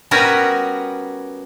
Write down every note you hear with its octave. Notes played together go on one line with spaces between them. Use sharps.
G3 B3 C#4 F#4 A#4